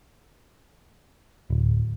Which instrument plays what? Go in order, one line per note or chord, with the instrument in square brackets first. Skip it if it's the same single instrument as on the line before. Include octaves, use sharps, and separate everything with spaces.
[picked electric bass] D1